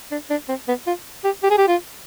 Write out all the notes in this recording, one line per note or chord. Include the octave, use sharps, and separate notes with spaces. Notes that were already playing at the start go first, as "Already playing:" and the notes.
D4
D4
C4
B3
F4
G4
G4
G#4
G4
F4